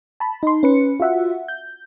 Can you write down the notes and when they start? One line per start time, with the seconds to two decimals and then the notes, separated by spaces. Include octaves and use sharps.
0.20 A5 B5
0.43 D#4 C6
0.63 C#4 B4 C#7
1.00 F4 F#4 E5 F#5
1.48 G6